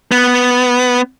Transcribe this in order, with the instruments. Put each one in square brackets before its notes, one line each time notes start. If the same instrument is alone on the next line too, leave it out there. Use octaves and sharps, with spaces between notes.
[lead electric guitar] B3